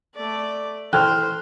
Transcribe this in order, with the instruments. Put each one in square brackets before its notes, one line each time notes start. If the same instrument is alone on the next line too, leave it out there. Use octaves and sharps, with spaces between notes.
[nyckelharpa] A3 D5
[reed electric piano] E3 A4 [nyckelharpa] C5 [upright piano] G5 F6 [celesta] F#6